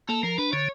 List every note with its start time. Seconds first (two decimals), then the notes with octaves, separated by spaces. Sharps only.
0.09 A#3 A4
0.23 F3 A#4
0.38 D4 B4
0.52 D3 C#5